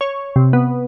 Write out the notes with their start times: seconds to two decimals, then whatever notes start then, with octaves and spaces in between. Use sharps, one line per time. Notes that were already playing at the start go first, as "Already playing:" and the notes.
0.01 C#5
0.36 C3
0.53 B3